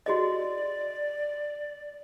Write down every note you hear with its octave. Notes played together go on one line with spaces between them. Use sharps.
F#4 G#4 D5 D#5